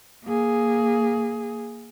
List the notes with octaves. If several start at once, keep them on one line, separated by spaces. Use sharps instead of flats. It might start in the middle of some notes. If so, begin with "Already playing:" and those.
A#3 G#4